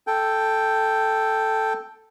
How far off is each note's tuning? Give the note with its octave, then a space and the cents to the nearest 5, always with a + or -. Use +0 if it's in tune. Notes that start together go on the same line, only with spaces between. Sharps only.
A4 +0 G5 +0